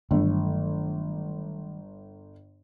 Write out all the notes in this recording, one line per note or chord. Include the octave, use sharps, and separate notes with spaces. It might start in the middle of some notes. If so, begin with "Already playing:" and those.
G1 D#3 F#3 A3